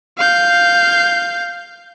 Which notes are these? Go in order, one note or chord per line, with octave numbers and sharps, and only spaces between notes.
F5 G6